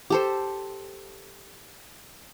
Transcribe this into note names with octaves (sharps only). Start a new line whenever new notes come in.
G4 A4 C5